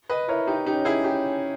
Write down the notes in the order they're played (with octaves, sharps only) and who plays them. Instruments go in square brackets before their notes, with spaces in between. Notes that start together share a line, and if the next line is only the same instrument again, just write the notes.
[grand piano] B4 D#5
[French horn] E4 [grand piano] A#4 C#5
[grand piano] D#4 G4
[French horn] C#4 [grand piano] D#4 G4
[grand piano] E4 G#4
D#4 G4